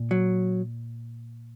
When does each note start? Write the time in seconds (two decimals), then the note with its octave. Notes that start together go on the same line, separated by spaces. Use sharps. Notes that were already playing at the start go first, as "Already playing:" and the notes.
Already playing: A#2
0.11 F#3